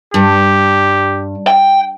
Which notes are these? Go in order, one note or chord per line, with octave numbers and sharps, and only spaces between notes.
G2 G4
G5